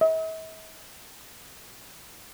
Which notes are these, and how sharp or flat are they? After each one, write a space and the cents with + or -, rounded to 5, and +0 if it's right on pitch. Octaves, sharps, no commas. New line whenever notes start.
E5 -45